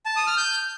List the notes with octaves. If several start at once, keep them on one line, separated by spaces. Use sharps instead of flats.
A5
D#6
F6
G6